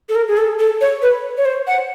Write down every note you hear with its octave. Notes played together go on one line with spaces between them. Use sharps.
A4
A#4
G#4
A4
A4
C#5
B4
C#5
C5
F#5